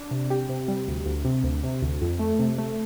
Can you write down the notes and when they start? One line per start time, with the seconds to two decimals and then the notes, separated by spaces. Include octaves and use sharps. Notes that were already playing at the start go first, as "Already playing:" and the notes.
Already playing: D4
0.11 C3
0.30 G4
0.49 C3
0.68 G3
0.87 D2
1.06 D2
1.25 C3
1.44 D2
1.63 C3
1.82 D2
2.01 F2
2.19 A3
2.39 C3
2.58 A3